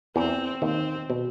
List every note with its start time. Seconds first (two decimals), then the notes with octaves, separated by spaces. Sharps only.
0.16 E2 E3 C4
0.62 D#2 D#3 C4
1.10 B2